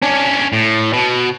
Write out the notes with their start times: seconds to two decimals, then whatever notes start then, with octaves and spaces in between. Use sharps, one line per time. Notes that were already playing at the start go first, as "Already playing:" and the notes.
0.02 C#4 D4
0.53 A2
0.93 B2